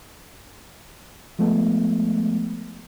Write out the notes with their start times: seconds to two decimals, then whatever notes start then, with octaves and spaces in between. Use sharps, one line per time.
1.39 F3 G#3 A3 B3